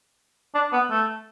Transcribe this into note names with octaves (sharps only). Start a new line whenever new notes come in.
D4
B3
A3